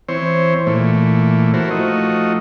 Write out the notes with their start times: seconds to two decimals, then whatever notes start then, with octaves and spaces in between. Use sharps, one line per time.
0.09 E3 C4 C5 C#5
0.67 A#2 E3 A3
1.54 E4 F#4 A4 A#4 C5
1.70 F3 A3 D#4 F#4